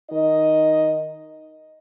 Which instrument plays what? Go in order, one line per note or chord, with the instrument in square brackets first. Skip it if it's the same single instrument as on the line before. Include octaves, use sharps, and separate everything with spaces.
[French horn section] D#3 D#4 D#5